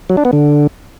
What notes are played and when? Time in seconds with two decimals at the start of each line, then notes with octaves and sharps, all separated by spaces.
0.10 F#3
0.17 D4
0.25 B3
0.33 D3